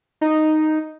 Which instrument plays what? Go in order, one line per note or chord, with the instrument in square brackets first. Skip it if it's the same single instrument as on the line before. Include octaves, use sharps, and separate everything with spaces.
[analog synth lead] D#4